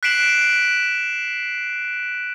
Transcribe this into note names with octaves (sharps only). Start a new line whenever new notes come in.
F#6 B6 C7 D7 E7 F#7